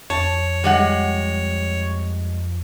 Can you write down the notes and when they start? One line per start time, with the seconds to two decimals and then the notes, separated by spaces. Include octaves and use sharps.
0.10 F2 C#5 A5
0.64 G3 G#3 F#5